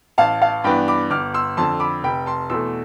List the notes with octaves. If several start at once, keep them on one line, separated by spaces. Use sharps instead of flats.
A1 F5 A5
F5 A5
G2 E3 B3 D4 G5 B5
B5 D6
G1 D6 F6
C6 E6
F2 D3 A5 C6
B5 D6
F1 G5 B5
A5 C6
E2 B2 A3 C6 E6